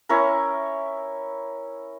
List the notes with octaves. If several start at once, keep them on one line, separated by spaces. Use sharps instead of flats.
C#4 E4 A#4